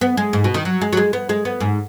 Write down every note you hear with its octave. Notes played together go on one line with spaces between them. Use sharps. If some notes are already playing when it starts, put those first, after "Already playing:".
B3
G#3
G#2
B2
D#3
F#3
G#3
F#3
G#3
B3
G#3
B3
G#2